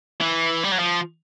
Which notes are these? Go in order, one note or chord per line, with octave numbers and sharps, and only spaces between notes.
E3
G3
F#3
F3